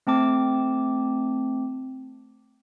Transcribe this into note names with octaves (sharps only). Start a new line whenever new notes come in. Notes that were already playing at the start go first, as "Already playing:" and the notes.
A3 C4 A5 D6